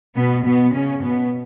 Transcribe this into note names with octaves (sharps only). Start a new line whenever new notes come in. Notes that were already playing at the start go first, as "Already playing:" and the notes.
B2 B3
B2 B3
C#3 C#4
B2 B3